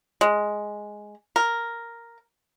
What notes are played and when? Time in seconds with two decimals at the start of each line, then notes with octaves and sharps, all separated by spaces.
0.21 G#3
1.36 A#4